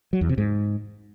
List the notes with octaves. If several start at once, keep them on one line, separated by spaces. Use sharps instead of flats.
F#3
E2
C3
G#2